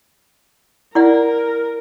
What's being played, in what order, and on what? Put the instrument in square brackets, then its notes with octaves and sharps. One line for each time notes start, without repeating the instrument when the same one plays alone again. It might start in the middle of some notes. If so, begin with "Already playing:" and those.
[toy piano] E4 D5 F#5 [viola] A#4